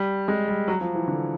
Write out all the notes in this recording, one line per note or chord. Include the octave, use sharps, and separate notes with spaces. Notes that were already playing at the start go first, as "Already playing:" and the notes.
Already playing: G3
G#3
G3
F#3
F3
E3
D3